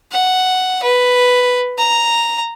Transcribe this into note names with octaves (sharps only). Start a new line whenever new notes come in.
F#5
B4
A#5